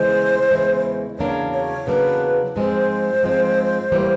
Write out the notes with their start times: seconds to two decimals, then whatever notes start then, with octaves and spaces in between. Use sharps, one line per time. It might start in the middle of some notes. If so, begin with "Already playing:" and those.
Already playing: E2 C#3 E3 G#3 C5
0.51 E2 C#3 E3 G#3
1.18 E2 C#3 F#3 A#3 D4 C#5
1.52 C#5
1.86 E2 C#3 F#3 A#3 D4 B4
2.56 G#2 F3 G#3 C4 C5
3.23 G#2 F3 G#3 C4
3.92 A2 E3 G3 A#3